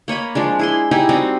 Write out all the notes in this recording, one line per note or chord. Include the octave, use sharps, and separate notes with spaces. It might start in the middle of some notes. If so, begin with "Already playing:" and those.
A#3 C#5 D#5 B5
F3 G#3 D4
E4 G#4 C6
D#4 E4 G4 G#4
G3 C4 F#4 D#5